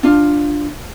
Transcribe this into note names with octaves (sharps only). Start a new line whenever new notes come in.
D4 F4